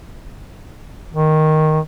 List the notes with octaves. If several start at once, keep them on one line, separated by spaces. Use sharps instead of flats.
D#3